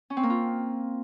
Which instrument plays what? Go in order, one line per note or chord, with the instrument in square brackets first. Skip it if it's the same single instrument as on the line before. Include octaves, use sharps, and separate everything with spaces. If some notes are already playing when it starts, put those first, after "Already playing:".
[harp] C#4
C4
A#3
F4